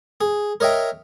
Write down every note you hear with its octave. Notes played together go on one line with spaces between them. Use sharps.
G#4
A#4 C#5 D#5 E5 G5